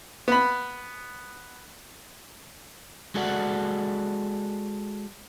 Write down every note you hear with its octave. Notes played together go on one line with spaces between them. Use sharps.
B3 B5
G#3 F#4 A4 D5 F#5